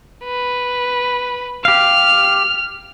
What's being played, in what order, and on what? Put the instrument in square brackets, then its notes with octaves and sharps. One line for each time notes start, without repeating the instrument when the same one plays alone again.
[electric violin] B4
[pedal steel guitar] G4 F5 [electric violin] F6